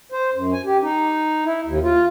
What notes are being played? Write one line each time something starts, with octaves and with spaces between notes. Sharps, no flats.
C5
F#2
G#5
G4
D#4
E4
D#2
F4